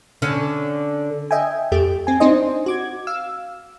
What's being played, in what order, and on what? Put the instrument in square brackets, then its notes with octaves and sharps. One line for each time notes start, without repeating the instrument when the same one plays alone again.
[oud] D3 C#4
[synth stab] D#5 E5 G5 G#5
F2 A3 G4 D7
C4 G#5
C4 D4 D#4 C5 D#5
F#4 D6 G#6
F5 E6